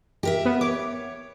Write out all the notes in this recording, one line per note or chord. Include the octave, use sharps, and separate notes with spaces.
G4 A#4 E5
B3
C#5 D6